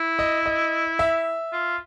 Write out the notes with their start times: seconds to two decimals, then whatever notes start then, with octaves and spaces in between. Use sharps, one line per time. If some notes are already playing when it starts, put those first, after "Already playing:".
Already playing: E4
0.19 D#5
0.46 D#5
0.99 E5
1.53 F4